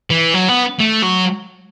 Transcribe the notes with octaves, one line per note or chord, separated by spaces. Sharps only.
E3
F#3
B3
A3
F#3